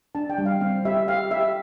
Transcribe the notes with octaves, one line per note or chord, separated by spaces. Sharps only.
D4 A5
G5
G3
F5
C4 F5
G4 E5
G4 F5
G4 E5